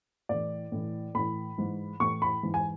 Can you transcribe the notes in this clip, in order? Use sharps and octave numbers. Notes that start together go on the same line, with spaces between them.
A2 E3 D5
A2 E3
A2 E3 B5
G#2 E3
A2 E3 C#6
B5
G#2 E3
G#5